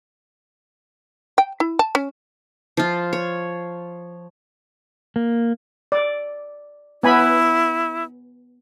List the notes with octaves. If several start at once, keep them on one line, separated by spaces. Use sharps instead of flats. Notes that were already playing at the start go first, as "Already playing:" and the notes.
G5
E4
A5
C#4
F3 F4
C#5
A#3
D5
B3 E4 G#5 B5